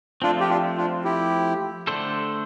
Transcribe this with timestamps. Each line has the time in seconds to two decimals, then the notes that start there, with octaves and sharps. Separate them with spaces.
0.22 F3 A3 C4 D4 F4
0.40 G4
0.49 D4 F4
0.78 D4 F4
1.04 E4 G4
1.87 D3 A3 D4 A4 C5